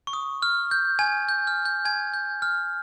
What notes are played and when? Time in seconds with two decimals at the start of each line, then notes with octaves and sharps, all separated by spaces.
0.07 C#6
0.13 D#6
0.42 F6
0.71 G6
0.99 G#5 G#6
1.29 G6
1.47 F6
1.65 G6
1.85 G#5 G#6
2.14 G6
2.42 F6